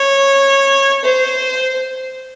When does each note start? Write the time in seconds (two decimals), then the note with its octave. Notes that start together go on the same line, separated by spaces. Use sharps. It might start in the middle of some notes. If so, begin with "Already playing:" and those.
Already playing: C#5
1.05 C5